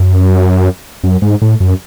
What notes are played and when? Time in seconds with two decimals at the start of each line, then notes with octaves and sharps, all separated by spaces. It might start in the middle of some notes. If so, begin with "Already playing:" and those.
Already playing: F#2
1.04 F#2
1.22 G#2
1.42 A2
1.60 F#2